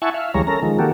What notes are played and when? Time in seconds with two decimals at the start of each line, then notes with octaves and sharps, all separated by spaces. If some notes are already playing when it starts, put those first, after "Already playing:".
0.02 E4 E5 F#5 G#5 A5 C#6
0.14 E5 F5
0.34 D2 E3 G3 G#3 C#5 A#5
0.47 C#4 A4 A#4 A#5
0.63 D#3 F3 G#3
0.79 D#3 A#3 F#4 G4 A4